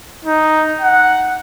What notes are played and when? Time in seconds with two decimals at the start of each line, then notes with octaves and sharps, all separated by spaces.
0.25 D#4
0.81 F#5